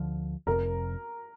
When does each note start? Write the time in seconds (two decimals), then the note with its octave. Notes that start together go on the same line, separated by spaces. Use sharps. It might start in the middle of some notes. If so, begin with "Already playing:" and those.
Already playing: D2 D3 F3
0.47 F1 F2 C3 A#4